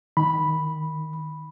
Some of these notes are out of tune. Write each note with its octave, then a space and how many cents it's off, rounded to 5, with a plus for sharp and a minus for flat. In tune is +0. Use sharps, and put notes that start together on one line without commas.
D#3 +0 B5 -5